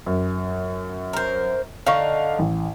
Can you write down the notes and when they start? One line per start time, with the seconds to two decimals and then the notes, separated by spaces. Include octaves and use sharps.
0.06 F#2
1.13 A#4 C5
1.87 D3 D#4 F5 C#6
2.39 A1